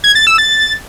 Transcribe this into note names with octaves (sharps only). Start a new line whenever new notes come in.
G#6
A6
E6
A6